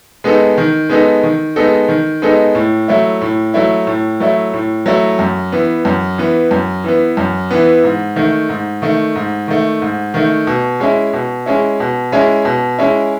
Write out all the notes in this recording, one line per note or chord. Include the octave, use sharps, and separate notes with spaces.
G#3 B3 D#4 A4
D#3
G#3 B3 D#4 A4
D#3
G#3 B3 D#4 A4
D#3
G#3 B3 D#4 A4
A2
F#3 A3 E4
A2
F#3 A3 E4
A2
F#3 A3 E4
A2
F#3 A3 E4
F#2
E3 B3
F#2
E3 B3
F#2
E3 B3
F#2
E3 B3
G#2
D#3 A3
G#2
D#3 A3
G#2
D#3 A3
G#2
D#3 A3
B2
G#3 C#4 E4
B2
G#3 C#4 E4
B2
G#3 C#4 E4
B2
G#3 C#4 E4